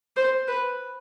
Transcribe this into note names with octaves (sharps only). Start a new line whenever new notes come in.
C5
B4